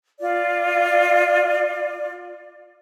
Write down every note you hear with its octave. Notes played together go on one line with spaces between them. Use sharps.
F4 D5